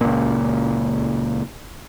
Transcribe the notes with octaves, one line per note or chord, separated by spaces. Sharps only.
C#2 A#2